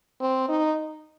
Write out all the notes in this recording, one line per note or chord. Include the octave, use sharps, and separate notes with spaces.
C4
D#4